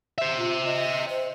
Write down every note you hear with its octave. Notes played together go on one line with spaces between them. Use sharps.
C5 E5
F4
D#5
C5